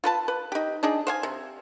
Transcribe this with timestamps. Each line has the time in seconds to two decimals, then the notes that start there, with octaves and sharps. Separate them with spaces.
0.04 F4 B4 A5
0.28 B4
0.52 D#4 G4
0.83 D4 D#4 G#4
1.07 C5 F5 G#5
1.23 C3